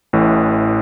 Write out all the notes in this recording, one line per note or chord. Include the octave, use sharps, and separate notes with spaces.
A1 A2 E3